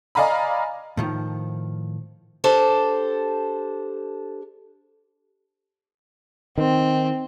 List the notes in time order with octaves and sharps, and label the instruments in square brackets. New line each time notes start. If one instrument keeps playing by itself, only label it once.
[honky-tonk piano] D5 D#5 F5 G#5 A#5 B5
[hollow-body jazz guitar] A2 D#3 F3
[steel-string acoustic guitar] D4 G4 A4 C5
[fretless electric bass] D#3 [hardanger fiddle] C4